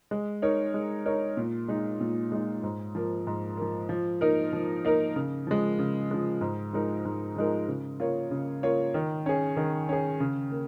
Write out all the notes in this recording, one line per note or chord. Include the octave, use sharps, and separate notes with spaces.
G#3
D#4 A#4 C#5
G#3
D#4 A#4 C#5
A#2
G#3 D#4
A#2
G#3 D#4
G#2
F3 A#3
G#2
F3 A#3
F3
A#3 D#4 A#4
F3
A#3 D#4 A#4
C#3
F3 G#3
C#3
F3 G#3
G#2
F3 G#3 D#4 A#4
G#2
F3 G#3 D#4 A#4
C#3
A#3 F4 C#5
C#3
A#3 F4 C#5
D#3
C#4 G#4
D#3
C#4 G#4
C#3
A#3